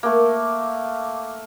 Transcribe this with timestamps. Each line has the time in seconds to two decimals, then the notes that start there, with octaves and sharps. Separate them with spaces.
0.03 A3 A#3